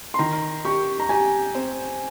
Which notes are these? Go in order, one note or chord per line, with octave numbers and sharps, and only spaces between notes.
C6
D#3 A#5
G4 C#6
A#5
G4 G#5
C4